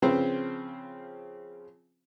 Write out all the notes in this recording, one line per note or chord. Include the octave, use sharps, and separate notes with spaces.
C#3 F3 C4 F4 B4 C5